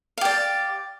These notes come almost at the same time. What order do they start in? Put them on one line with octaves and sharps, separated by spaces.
F5 G4 D5